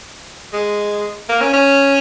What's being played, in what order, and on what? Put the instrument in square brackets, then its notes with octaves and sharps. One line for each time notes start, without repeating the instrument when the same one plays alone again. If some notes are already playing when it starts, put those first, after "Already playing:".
[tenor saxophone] G#3
A#3
C#4
C#4